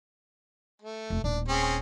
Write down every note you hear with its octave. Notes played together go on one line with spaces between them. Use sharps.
A3
F1
D#1 D4
C4 C#4 G#4